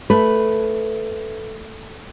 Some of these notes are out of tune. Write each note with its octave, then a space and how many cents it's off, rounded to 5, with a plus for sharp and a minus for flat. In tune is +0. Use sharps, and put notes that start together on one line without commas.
A3 +0 B4 +0